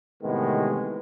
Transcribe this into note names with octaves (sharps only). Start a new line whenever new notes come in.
A2 C3 D#3 E3 G#3 B3